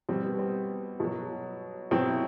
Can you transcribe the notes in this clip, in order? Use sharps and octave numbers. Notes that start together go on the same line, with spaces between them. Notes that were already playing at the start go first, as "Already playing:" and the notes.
B2 G3 C4
B3
C4
B2 F#3
B2 F#3 C4
E4